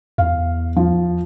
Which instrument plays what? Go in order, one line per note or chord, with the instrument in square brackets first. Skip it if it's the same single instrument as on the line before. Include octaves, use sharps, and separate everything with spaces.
[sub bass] E2 [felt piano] F5
[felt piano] F3